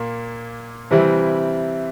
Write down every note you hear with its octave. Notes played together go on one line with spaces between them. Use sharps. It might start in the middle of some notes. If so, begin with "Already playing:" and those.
Already playing: A#2 A#3
C3 E3 G3 C4 E4